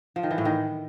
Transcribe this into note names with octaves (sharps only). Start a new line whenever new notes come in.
F3
D#3
E3
A2
D#3